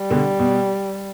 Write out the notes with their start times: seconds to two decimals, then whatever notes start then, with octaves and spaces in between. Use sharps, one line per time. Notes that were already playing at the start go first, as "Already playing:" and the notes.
Already playing: G3
0.10 B2 D3
0.39 B2